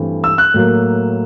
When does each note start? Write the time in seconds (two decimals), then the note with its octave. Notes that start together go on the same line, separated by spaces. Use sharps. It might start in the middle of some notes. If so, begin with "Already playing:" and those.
Already playing: G2 E3 A3 C4
0.24 E6
0.38 F#6
0.54 A2 F#3 A#3